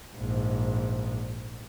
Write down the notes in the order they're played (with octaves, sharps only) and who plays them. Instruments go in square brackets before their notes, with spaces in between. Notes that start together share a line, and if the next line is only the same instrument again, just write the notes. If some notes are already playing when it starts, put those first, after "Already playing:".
[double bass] A#1 G#2